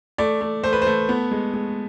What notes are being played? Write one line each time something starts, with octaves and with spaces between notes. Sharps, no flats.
A3 D5
A3
A3 C5
B4
C5
A3
B3
G#3
G#3